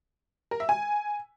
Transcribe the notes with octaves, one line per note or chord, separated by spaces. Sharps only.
A#4
E5
G#5